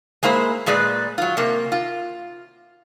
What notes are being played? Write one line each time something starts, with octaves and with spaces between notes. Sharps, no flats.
G#3 A#3 E4 C5
A#2 G#3 G#4 B4 D5
F#3 F4
C3 A#3
F4